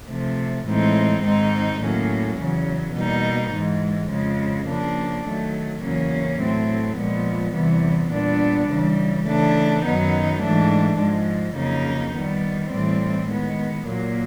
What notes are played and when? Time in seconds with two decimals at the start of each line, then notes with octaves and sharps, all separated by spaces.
0.08 C3 F3 A3
0.67 A2 E3 G#3 C4 D#4
1.23 G#2 D#3 G#3 C4 D#4
1.81 A2 F#3 A#3 C#4
2.38 E2 C#3 F#3
2.95 B2 G3 A#3 D#4
3.53 G#2 E3 G#3
4.10 F2 C#3 F3 G#3
4.67 C#3 F3 A#3 D4
5.25 D#3 F#3 A3
5.82 E2 C#3 F#3 A#3 C#4
6.39 A2 F#3 A3 C4
6.97 A#2 F3 G#3 B3
7.55 E2 C3 E3 G3 B3
8.12 A#2 G3 B3 D4
8.69 C#3 E3 G3
9.27 C#3 E3 A3 D4
9.85 F#2 D#3 F#3 B3 D#4
10.42 G#2 E3 A3 D4
10.99 G#2 F3 G#3
11.57 F2 C#3 F#3 A#3 D#4
12.14 D#3 G3 B3
12.71 A2 E3 G3 C4
13.28 D#3 G#3 B3
13.86 A#2 F#3 A#3